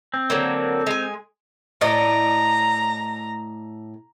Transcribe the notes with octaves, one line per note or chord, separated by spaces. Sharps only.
C4
D3 F#3 A#3
G#3 G#5
A2 D5 D#5 A#5